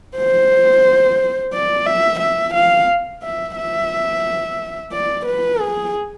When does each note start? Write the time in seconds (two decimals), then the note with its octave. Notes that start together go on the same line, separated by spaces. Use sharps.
0.17 C5
1.53 D5
1.86 E5
2.20 E5
2.54 F5
3.23 E5
3.56 E5
4.92 D5
5.26 B4
5.60 G#4